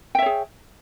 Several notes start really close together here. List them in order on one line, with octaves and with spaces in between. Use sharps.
G5 E5 C#5 G#4